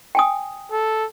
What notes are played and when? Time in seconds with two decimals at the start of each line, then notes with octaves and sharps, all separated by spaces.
0.15 G5 G#5 D#6
0.72 A4